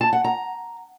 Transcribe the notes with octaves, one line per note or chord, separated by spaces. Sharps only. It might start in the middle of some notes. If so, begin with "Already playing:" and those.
A5
F#5
A#5